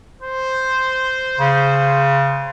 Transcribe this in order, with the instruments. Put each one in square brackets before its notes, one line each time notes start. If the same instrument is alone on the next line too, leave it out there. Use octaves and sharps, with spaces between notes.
[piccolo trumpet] C5
[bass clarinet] C#3